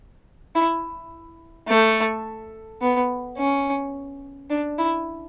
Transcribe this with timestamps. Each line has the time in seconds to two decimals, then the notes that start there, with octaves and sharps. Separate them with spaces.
0.55 E4
1.68 A3
2.81 B3
3.37 C#4
4.50 D4
4.78 E4